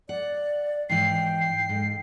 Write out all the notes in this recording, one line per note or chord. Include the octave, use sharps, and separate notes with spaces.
D5 F#5
G#2 E3 G5 C7
C7
G#2